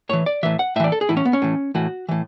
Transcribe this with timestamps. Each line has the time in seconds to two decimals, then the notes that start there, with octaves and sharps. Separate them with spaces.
0.09 A2 E3 C#5
0.26 D5
0.43 A2 E3 E5
0.59 F#5
0.76 A2 E5
0.80 E3 D5
0.92 A4
1.01 G#4
1.09 A2 E3 E4
1.17 C#4
1.25 B3
1.33 C#4
1.42 A2 E3
1.75 A2 E3 F#4
2.09 A2 E3